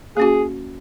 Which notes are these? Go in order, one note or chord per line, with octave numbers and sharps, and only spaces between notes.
A#3 C#4 F#4 G#4